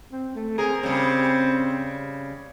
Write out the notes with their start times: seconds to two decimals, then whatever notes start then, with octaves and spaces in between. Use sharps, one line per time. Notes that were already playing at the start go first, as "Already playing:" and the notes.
0.12 C4
0.35 A3
0.58 C4 G#4 A#4
0.83 C#3 G3 C4